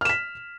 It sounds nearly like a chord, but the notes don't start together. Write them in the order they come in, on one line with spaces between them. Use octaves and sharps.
F6 E7 B6